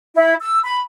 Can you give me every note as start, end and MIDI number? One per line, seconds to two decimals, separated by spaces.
0.15 0.34 64
0.40 0.59 88
0.64 0.78 83